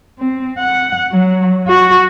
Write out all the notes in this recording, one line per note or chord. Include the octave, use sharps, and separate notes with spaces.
C4
F#5
F#3
F#4